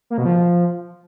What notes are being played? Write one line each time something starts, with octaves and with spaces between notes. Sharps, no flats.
A#3
B2
F3